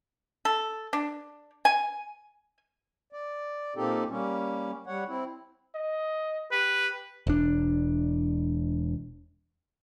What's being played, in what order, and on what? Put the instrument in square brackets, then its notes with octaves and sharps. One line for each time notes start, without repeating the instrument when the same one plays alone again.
[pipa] A4
D4
G#5
[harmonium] D5
A#2 A#3 C4 D#4 G4 A4
G3 A#3 C#4
G3 C#5 F#5
C4 E4
[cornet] D#5
[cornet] G4 [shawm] B4
[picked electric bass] E1 D4